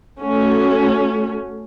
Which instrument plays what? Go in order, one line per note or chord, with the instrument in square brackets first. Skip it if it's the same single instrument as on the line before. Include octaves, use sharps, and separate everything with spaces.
[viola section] A3 C#4 F#4